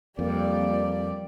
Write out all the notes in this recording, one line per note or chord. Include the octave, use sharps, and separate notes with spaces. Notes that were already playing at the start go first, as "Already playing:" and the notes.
F2 G3 A#3 D5